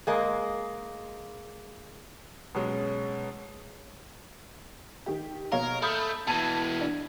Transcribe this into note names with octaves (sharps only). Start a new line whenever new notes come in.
G#3 A#3 D#5
B2 F#3 G#3 C#4
D#3 G4
B2 A#4 C#5 F5
A3 B5 D#6 G6
B2 E3 A5 G#6 D#7
D4